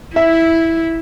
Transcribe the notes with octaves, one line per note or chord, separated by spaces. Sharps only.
E4 E5